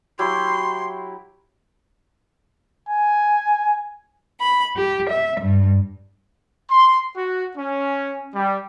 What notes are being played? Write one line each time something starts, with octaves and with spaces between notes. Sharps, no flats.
F#3 E4 G4 C6
G#5
B5
G4
E5
G2
C6
F#4
C#4
G3